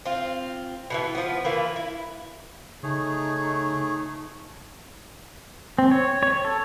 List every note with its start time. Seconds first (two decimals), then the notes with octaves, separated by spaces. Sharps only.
0.05 C4 F4
0.90 B2 D#3 E3
1.15 F3 B3
1.45 E3 A#3 F4 B4
1.76 E4
2.83 C#3 A3 D#4 G#4 C#5
5.78 C4
5.91 C#5
6.23 C#5
6.45 A4